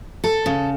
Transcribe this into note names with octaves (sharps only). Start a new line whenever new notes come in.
A4
C#3